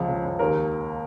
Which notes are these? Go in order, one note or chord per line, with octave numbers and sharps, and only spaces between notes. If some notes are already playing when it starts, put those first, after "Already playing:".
Already playing: C#2 F3
C#3
C#2
D#2 A#4